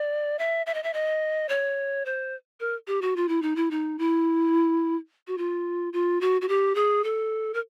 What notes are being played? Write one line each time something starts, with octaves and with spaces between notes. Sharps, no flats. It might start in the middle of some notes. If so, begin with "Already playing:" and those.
Already playing: D5
E5
E5
D#5
E5
D#5
C#5
C5
A#4
G4
F#4
F4
E4
D#4
E4
D#4
E4
F#4
F4
F4
F#4
F#4
G4
G#4
A4
A#4